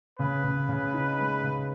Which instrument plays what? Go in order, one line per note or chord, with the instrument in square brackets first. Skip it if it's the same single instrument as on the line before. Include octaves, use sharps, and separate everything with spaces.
[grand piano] C#3 [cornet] B4
[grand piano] C#3
C#3
D#4
G#3
C#3